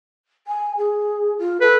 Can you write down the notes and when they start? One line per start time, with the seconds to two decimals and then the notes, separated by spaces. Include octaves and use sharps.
0.47 G#5
0.77 G#4
1.38 F4
1.61 A4 B4